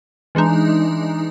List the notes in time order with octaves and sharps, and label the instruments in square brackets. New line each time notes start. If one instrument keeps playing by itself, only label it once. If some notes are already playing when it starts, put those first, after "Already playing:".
[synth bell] E3 G#3 D4 D#4